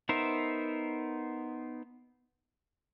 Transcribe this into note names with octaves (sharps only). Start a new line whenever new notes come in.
B3 D#4 A#4 C5 E5